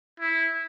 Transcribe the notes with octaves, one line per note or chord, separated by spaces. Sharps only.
E4